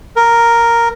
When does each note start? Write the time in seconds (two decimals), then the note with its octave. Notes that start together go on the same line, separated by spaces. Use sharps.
0.16 A#4